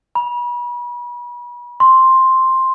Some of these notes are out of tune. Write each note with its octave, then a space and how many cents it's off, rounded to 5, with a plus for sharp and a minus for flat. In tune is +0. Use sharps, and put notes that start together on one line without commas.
B5 -35
C6 +5